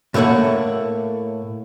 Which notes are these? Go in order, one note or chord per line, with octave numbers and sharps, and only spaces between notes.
A2 A3 A#3 C#5 F#5